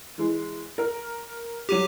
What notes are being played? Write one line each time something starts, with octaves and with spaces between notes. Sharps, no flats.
E3 G#3
A#4
F#3 G4 D#7 F7